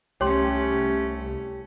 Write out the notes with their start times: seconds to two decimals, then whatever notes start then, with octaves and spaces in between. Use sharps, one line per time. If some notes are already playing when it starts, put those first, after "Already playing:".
0.21 C2 A3 C#4 G4 C#5 C6